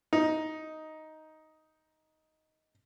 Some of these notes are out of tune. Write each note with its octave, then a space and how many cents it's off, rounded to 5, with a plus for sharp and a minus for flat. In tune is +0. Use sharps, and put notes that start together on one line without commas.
D#4 +5